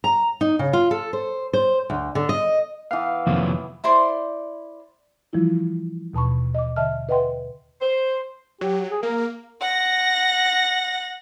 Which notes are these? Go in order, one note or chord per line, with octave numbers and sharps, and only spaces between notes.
A#5
D#4
C#3
F4
A4
C5
C5
D2
D3
D#5
E3 B3 F5
F2 C3 D#3 F3 F#3 A#3
E4 C5 D5 C6
E3 F3 G3 E4 F4
D#2 B2 A5 B5 C#6
D#5 D6
D3 D#5 E5 A5 F6
B4 D#5 E5 F#5 G5 C6
C5
F#3 G4
G#4
A#3 A#4
F#5 A#6